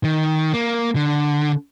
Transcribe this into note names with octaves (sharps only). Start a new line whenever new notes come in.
D#3
A#3
D3